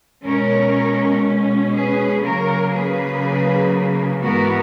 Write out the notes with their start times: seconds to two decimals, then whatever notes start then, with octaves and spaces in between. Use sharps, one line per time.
0.24 B2 G#3 C#4 A#4 C#5
1.73 G#4 B4
2.23 C#3 F#3 A#3 A#4 C#5
2.72 G#4 B4
4.22 G#2 E3 B3 F#4 A#4